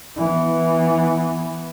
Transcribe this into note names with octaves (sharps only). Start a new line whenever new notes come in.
E3 B3